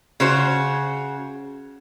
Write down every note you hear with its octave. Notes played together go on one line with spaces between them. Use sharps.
C#3 F#4 C5